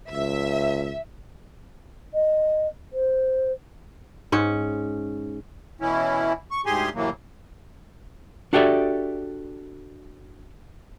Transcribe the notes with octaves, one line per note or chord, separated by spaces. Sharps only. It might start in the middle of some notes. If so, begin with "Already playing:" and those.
C#2 E5
D#5
C5
G#2 C#4
B2 E3 C#4 E4
C#6
D2 G#2 G4 G#4 G#5 C6
A2 C3 E3 F#3 A#3
D4 F#4 G4 A4 D5 E5